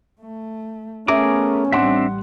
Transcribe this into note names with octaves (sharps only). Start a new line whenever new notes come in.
A3
A3 B3 C#4 G#4 A#4 E5 D6
A1 G3 C4 D4 E5 F#5 C6